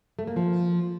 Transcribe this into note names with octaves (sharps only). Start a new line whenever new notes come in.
A3
A#3
F3